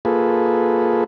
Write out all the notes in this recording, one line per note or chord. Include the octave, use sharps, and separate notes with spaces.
A#3 F4 G#4 A4 B4